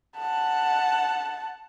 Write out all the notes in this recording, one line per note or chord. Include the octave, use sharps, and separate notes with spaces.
F#5 A5